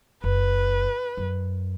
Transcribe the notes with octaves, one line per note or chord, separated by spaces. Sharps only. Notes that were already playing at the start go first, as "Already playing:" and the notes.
F#1 B4
F#2